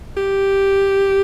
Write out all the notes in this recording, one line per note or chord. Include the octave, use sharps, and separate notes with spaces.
G4